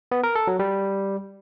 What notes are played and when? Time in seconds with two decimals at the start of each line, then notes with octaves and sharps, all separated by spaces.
0.12 B3
0.23 A#4
0.35 A4
0.47 F#3
0.59 G3